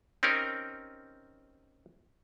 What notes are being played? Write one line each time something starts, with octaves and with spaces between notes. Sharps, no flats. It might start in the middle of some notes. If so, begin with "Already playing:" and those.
C4 C#4 D#4 G4 A#4